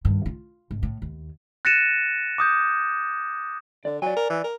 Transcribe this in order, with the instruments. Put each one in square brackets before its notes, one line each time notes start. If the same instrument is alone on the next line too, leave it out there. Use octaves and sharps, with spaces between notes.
[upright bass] G2 D#3
F4
G#1
A2
D#2
[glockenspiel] F#6 A6 A#6 C#7 D#7 E7
D6 D#6 G6
[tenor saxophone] D3 [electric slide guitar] D5
[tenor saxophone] F#3 [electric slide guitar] D5 G#5
[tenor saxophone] A#4
E3
A#4